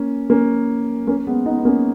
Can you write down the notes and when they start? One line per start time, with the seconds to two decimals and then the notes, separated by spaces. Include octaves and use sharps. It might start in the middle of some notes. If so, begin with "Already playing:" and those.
Already playing: A#3 C#4
0.30 A#3 C#4
1.07 A#3 C#4
1.27 G#3 B3
1.46 B3 D#4
1.58 B3
1.65 A#3 C#4